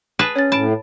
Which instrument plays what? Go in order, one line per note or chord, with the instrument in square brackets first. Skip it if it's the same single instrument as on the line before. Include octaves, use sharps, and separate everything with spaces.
[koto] G#4 B4 A5
[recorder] C#4 [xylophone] C#5 A6
[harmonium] A2 [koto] A5 [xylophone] B5 D7